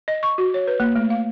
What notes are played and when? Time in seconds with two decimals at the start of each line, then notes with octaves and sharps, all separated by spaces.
0.08 D#5
0.23 C#6
0.38 F#4
0.54 C#5
0.67 B4
0.80 A#3
0.95 A3
1.10 F5